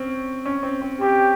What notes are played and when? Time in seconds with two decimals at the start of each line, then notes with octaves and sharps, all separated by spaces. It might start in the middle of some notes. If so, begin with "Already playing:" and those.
Already playing: C4 C#4
0.45 C#4
0.63 C4
0.82 C4
1.01 C4 G4